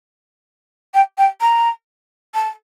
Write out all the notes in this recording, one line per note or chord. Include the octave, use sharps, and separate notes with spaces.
G5
G5
A#5
A5